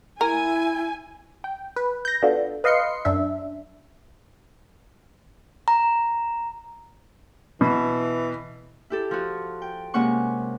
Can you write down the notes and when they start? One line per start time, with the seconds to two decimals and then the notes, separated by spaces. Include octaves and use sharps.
0.21 E4 A#4 G#5
1.44 G5
1.76 B4
2.05 G6 A#6
2.22 B3 D4 F4 F#4 A4
2.64 B4 D#5 F5 C6 C7 C#7
3.05 F#2 D4 E5
5.68 A#5
7.61 B2 E3
8.90 E4 G4 A4
9.11 F3 F#4
9.62 G5
9.94 C3 G#3 A#3 C#4 F#5 C#6